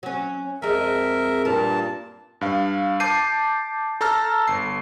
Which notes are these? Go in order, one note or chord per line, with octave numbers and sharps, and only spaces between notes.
F#3 C#4
F2 G#3 A#4 E5
G2 A#2 A#4 A5
G2 F5
A5 D6 G6 C7 D#7
A4 A5 A#5 E6 F6
G1 C7